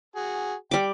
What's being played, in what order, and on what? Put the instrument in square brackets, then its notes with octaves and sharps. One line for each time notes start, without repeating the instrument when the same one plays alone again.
[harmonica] F#4 G#4
[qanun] G3 D6 [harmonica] G5